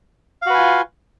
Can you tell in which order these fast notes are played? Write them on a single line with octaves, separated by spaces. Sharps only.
F5 F#4 B4 G#5 F4